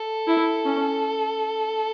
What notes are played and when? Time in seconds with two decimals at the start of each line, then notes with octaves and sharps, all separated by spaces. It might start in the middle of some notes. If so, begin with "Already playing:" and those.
Already playing: A4
0.27 E4
0.65 C#4